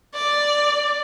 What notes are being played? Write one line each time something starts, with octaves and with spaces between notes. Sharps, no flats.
D5